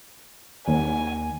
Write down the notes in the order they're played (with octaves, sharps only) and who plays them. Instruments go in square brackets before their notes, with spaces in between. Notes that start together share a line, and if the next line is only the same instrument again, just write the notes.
[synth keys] D#2 [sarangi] G#5